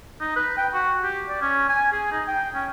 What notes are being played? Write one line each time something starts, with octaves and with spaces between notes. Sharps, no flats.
D#4
B4
G5
F#4
G4
D5
C#4
G#5
G#4
D#4
G5
C#4